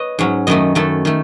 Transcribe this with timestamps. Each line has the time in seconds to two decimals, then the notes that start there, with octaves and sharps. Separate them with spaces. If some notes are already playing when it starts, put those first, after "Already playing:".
Already playing: B4 C#5 D#5
0.19 G#2 F#3 C#4
0.47 F#2 D#3 A3 D#5
0.75 F#2 D#3 A3 A4
1.05 D#3 A3